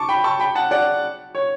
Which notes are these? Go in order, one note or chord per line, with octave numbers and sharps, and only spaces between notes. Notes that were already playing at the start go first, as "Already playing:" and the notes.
Already playing: A5 C#6 D6
G5 B5
A5 C#6
G5 B5
F#5 A5
D5 F#5
C#5